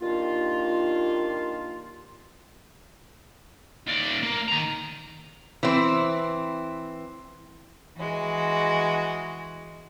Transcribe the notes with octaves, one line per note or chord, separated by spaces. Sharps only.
D#3 G3 A#3 D4 F4
D#2 D5
A#3
D#3 A#5
E3 C4
E3 G#3 F#4